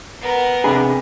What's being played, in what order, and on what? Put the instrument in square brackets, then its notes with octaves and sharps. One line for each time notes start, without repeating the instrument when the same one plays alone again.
[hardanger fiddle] B3 A#4
[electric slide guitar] C3 D4 G#4 [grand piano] B5